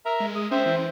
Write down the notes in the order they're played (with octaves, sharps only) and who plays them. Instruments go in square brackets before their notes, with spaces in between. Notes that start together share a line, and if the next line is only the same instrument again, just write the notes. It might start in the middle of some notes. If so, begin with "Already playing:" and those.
[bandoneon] A#4 E5 A#5
[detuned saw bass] G#3
[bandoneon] D#6
[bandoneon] C4 C5 E5 [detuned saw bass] C#4
[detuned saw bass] E3